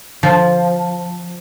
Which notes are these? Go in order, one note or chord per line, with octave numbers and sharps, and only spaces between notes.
F3